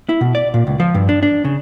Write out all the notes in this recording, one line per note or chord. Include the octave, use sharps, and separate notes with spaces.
E4
B2
D5
A#2
C#2
F3
G2
D4
D4
C#3